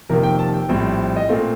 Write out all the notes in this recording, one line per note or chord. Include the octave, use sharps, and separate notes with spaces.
F1 F2 C3 D#3 A#3 A#4
G5
A5
G5
A#1 A2 G3 C4
D#5
A#2 A3 C4 F5